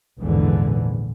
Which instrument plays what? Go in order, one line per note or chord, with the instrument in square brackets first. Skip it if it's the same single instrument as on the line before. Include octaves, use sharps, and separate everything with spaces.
[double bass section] A#1 E2 G#2 D3 E3